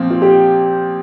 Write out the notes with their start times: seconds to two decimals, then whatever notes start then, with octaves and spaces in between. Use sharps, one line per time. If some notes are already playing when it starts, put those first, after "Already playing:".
Already playing: A#2 F3 C4
0.10 F4
0.22 G4